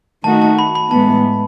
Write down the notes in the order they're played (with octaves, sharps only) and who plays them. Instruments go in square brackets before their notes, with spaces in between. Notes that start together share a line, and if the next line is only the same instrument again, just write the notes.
[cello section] D#3 A3 D#4 F#4 [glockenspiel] A5
[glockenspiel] A5
B5
B5
[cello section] A2 E3 G#3 B3 [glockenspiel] A5